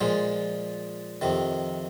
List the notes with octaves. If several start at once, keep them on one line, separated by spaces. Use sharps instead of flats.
A#2 F3 G#3
F2 C3 D#3